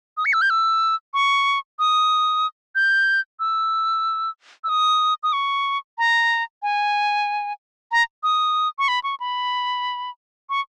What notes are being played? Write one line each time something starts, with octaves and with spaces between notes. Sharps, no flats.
D#6
C#7
E6
G6
E6
C#6
D#6
G6
E6
E6
D#6
D#6
C#6
A#5
G#5
A#5
D#6
C#6
B5
C#6
B5
C#6